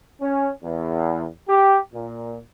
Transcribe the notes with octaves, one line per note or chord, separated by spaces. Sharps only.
C#4
E2
G4
A#2